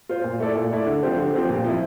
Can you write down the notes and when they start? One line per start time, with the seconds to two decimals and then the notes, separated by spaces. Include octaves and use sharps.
0.09 F4 C5
0.24 A#2
0.40 A3 E4 A4 D5
0.55 A#2
0.72 A3 E4 A4 D5
0.87 D3
1.03 F3 C4 G4 C5
1.17 D3
1.34 F3 C4 G4 C5
1.49 A#2
1.64 F3 C4 E4